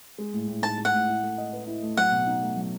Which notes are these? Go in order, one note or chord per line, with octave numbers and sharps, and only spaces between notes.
G#3
A2
A2
D#4 A5
G#3
F#5
A2
E4
A3
D#5
B4
E4
A3
F#3 F#5
B2
D#4
A3
F#3